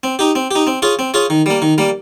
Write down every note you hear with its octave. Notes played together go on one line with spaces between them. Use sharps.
C4
D#4 G4
C4
D#4 G4
C4
F4 G#4 C#5
C4
F4 G#4 C#5
D#3
G3 A#3
D#3
G3 A#3